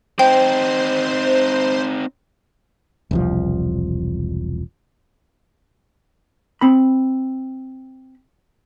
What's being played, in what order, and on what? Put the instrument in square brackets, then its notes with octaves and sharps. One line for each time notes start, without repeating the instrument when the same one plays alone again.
[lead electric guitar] C4 D#4 [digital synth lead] C5 [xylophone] G5
[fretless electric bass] E1 C2 F3
[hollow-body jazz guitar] C4 B5